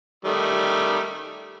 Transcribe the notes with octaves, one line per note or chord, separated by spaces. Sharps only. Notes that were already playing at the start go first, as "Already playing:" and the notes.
D#3 G3 A3